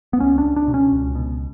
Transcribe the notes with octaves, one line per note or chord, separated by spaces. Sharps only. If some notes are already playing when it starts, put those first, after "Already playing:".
B3
C#2 C#4
D4
C#2
D4
B2
C#4
C#2
B2